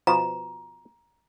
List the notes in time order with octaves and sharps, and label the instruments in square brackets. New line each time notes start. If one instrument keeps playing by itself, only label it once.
[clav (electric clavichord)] B2 F3 [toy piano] A#5